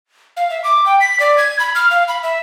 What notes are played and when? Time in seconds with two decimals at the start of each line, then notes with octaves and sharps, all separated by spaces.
0.37 F5
0.50 E5
0.64 D6
0.86 G5
1.00 B6
1.20 D5
1.38 G#6
1.60 B5
1.75 F6
1.91 F5
2.08 B5
2.23 E5